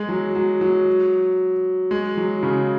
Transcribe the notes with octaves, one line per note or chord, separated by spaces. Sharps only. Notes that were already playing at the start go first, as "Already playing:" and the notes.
Already playing: G#3
F#3
F#3
F#3
G#3
F#3
C#3